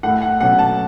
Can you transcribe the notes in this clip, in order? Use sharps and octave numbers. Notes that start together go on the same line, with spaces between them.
A2 A3 E4 F#5
F#5
B2 F#3 A3 C#4 F#5
A5